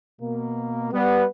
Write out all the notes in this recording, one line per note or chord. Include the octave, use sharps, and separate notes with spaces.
B2 A#3
G3 B3